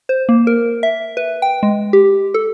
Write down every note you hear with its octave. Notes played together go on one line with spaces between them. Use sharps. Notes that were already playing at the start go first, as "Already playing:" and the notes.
C5
A#3
A#4
E5
B4
G5
G#3
G4
A4